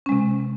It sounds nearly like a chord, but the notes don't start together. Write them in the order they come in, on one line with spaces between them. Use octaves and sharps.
C#4 G#3 C3